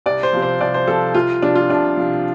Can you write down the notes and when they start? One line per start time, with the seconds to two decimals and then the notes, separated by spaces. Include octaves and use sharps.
0.06 C2 D5
0.23 C5
0.33 C3 F3
0.42 C5
0.60 C2 D5
0.74 C5
0.88 C3 F3 A4
1.15 C2 F4
1.42 C3 F3 D4
1.55 F4
1.69 C2 D4
1.97 C3 F3